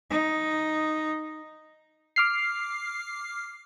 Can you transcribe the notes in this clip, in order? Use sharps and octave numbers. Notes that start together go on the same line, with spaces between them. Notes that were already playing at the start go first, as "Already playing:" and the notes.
D#4
D6 F6 C7